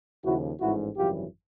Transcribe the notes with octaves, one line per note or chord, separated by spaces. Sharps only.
D#2 C#3 F3 E4 F#4
A1 G#2 F3 E4 F#4
G#1 F#2 C#3 E3 G3 F4 G4